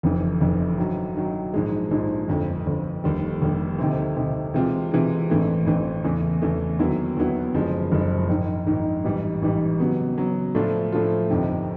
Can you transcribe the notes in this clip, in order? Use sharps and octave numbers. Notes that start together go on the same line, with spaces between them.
F1 F2 C#3 E3
F1 F2 C#3 E3
G2 D#3 F#3
G2 D#3 F#3
A#1 G#2 F3 G#3
A#1 G#2 F3 G#3
G1 F2 D3
G1 F2 D3
F1 D#2 D3 G3
F1 D#2 D3 G3
D2 C3 D#3
D2 C3 D#3
C3 E3 G#3 C4 F4
C3 E3 G#3 C4 F4
A1 G2 E3 A3 C4
A1 G2 E3 A3 C4
E2 C#3 E3 A3
E2 C#3 E3 A3
D#2 D3 F#3 B3 E4
D#2 D3 F#3 B3 E4
F#1 F#2 D3 F3 G#3
F#1 F#2 D3 F3 G#3
A#1 G#2 D#3
A#1 G#2 D#3
A1 G#2 E3 G3
A1 G#2 E3 G3
C#3 F#3 B3
C#3 F#3 B3
A2 F3 A3 D4 F4
A2 F3 A3 D4 F4
G1 F2 C3 D#3